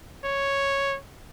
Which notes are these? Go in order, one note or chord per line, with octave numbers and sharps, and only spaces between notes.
C#5